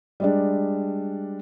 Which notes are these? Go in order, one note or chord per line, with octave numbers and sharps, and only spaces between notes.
G3 G#3 D4